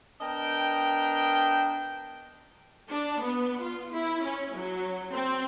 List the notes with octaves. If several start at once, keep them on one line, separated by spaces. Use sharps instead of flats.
B3 D4 A#4 D#5 G5
D4
B3
F4
E4
C#4
F#3
C4